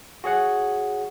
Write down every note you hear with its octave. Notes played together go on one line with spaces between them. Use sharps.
F#4 G#4 C#5 F#5